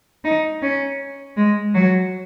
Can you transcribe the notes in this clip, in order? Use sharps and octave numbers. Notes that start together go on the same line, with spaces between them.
D#4
C#4
G#3
F#3